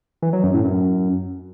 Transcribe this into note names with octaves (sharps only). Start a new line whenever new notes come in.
E3
F#3
F#2
A2
F#2